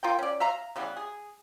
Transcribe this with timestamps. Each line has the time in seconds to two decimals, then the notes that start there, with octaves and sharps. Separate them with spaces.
0.03 F4 A#4 G5
0.19 C#4 D5
0.40 E5 F5 A#5
0.76 C#3 E3 G3 B3
0.96 G#4